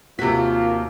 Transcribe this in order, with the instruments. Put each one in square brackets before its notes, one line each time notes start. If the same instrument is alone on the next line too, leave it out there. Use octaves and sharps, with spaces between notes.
[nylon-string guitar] D#2 F#4 [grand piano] C3 B6 [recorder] A#3 [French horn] F4